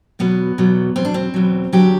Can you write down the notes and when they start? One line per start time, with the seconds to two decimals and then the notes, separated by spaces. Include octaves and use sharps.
0.19 E2 B2 F#3 B3
0.58 E2 B2 F#3
0.96 E2 B2 F#3 C4
1.05 D4
1.14 C4
1.34 E2 B2 F#3
1.73 E2 D3 F#3 G4